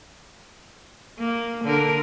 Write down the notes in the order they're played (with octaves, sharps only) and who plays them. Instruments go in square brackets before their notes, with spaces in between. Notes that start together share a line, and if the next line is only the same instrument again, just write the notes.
[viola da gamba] A#3
D3 A#4